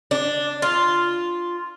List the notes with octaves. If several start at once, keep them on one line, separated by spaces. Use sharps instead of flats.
D4
F4